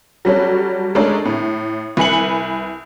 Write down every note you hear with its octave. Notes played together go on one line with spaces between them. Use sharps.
F#3 G3 C#4 A4
G#3 A3 C#4 D4 A4 A#4
A2
C2 B4 G#5 C#7 F#7